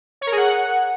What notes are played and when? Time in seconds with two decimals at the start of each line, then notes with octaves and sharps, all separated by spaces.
0.21 C#5
0.27 A#4
0.32 G#4
0.37 F#5